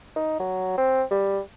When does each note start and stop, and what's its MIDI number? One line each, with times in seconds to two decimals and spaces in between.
0.16 0.36 63
0.39 0.76 54
0.78 1.03 60
1.11 1.40 55